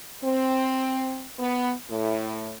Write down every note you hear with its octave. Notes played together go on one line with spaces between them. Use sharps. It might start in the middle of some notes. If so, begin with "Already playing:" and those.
C4
B3
A2